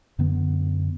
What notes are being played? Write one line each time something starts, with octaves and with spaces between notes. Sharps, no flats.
F#2 D3 B3